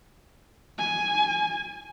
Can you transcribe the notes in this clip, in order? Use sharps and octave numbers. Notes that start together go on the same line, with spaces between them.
G#5